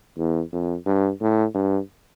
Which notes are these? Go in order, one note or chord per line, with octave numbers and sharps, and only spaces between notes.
E2
F2
G2
A2
G2